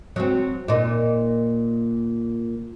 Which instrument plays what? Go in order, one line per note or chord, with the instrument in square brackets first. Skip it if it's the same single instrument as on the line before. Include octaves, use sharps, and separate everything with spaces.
[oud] F#3 C4
A#2 D#4